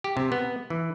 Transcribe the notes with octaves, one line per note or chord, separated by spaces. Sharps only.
G4
C3
B3
E3